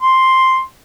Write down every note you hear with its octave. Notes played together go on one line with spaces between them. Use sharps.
C6